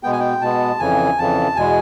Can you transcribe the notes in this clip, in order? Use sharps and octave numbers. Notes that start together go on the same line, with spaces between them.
B2 G#3 B3 G5
G#5
G5
B2 G#3 B3 A5
F2 C#3 E3 G#5
F2 C#3 E3 A5
E2 B2 G#3 G#5